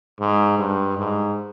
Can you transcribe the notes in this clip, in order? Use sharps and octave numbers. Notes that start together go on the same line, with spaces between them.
G#2
G2
G#2